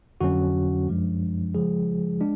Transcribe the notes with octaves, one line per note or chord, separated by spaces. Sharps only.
F2 D3 F#3 C#4 F#4
F#2 F3 G#3 D4
C#3 F3 G#3 G#4
G#3 D4